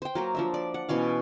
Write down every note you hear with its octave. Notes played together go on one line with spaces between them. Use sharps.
C5 G5
F#3 A#3 A#4
F3 D4 E5
D5
F#5
B2 E3 C#4 F5